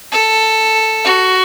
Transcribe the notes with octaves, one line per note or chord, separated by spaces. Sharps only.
A4
F#4